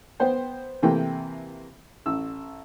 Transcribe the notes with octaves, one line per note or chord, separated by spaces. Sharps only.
B3 C5 G5
C3 E3 A3 A#3 G5
A1 E6